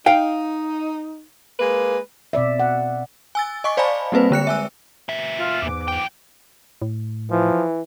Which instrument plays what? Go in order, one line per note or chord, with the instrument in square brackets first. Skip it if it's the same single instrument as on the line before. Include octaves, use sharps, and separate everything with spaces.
[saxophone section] D#4 [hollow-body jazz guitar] F5 G5
[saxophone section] G#3 A#3 B4
[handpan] B2 C4 D5 E5
F#5
[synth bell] G#5 E6 A6
D#5 G#5 C#6 D6
C5 D5 F5 G#5 A5 B5
G3 A#3 C4 B4 C5
D3 G#3 F#6 C#7
E5 G#5 E6
[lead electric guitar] A#2 E5
[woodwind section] F4
[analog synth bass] E2 [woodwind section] G#2 E3 D6
[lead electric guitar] F#2 G5
[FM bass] A2
[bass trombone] E3 [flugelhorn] F3